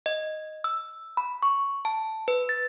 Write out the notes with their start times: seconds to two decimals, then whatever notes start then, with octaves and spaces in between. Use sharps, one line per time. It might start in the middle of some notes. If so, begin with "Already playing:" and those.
0.06 D#5
0.64 E6
1.17 B5
1.43 C#6
1.85 A5
2.28 B4
2.49 A6